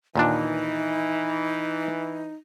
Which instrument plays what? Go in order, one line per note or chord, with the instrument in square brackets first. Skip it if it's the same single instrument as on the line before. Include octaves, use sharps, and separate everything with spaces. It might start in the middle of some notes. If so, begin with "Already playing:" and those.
[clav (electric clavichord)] D#2 A#2 D4 [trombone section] E3 [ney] D#4